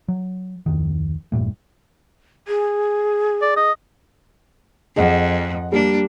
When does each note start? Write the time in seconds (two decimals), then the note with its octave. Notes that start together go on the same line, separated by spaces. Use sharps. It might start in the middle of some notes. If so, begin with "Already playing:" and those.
0.08 F#3
0.66 D1 F2 D#3
1.32 E1 G2 A#2 A3
2.48 G#4
3.42 D5
3.57 D#5
4.96 F2 G#4 D#5 F#5
5.72 G3 A#3 D4